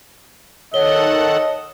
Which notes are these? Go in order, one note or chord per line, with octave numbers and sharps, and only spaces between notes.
D#3 A4 C#5 D#5 F#5 G7